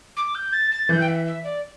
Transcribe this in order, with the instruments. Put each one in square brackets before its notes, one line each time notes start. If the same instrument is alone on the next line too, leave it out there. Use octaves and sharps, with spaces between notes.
[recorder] D6
G6
A6
A6
[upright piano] E3 [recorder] G6
[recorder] G5
E5
E5
D5